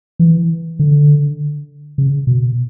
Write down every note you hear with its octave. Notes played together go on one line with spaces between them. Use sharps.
E3
D3
C#3
B2